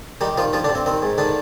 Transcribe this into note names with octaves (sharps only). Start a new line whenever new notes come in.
D#3 G3 D#4
D#3 F3 F4
G2 F3 F4
D3 D4
G2
C4
D#3 C4
G#2
D3 D#3 D4